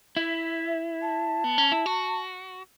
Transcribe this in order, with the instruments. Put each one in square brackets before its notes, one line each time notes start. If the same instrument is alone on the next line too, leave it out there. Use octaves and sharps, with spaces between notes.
[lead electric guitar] E4 [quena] E5
[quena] A5
[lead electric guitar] B3
C#4
E4
F#4